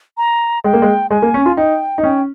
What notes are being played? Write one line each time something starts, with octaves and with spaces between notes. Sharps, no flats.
A#5
G#3 G5
A#3
G#3
G#3 G#5
A#3
C#4
F4
D#4 G5
D#4
C#4 G5